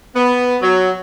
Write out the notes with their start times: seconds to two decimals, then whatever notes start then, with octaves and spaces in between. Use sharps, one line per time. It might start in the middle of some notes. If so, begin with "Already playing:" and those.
0.15 B3
0.61 F#3